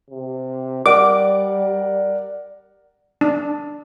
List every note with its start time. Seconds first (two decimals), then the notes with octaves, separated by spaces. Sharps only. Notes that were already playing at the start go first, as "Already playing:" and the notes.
0.10 C3
0.86 G3 A#4 D5 F#5 D6
3.21 D4